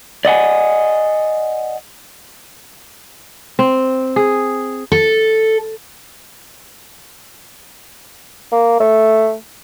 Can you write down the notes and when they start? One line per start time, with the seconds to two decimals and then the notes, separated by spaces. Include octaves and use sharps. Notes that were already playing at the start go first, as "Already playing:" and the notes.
0.25 D5 D#5 F#5 G#5
3.59 C4
4.16 G#4
4.92 A4
8.52 A#3
8.80 A3